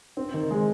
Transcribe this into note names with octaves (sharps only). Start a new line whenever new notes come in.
C4
D#3
G#3